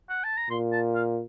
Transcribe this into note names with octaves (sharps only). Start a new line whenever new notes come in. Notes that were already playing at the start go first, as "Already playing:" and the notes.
F#5
A5
A#5
A#2 C6
A5
F5